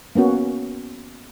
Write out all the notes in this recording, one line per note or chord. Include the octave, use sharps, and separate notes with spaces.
A#3 B3 C#4 F#4